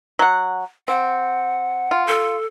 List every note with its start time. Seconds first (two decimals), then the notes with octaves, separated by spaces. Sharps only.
0.19 F#3 F#5
0.88 C4 F#5
1.91 F4
2.07 A4